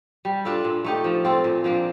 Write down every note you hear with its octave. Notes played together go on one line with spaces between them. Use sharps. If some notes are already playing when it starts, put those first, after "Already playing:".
G3
D4 F4 A4
A#2
A3 D#4 G4
F3
C4 F4 A4
A#2
F3 A#3 D4